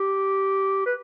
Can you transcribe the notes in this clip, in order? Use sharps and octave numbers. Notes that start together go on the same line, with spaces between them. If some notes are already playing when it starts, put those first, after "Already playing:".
Already playing: G4
B4